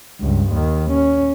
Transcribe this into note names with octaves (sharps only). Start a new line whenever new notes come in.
C#2 G2
D#2 D#3
C#4